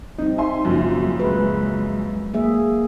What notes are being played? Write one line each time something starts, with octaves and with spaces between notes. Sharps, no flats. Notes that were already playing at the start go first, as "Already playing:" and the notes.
G3 C4 D#4
E5 G#5 C6
F#2 A#2 C#3 F3
F#3
C#2 F#3 G#3 B4
A#3 G#4 E5